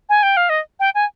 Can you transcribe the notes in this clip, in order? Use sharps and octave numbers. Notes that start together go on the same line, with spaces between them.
G#5
G5
F5
D#5
G5
G#5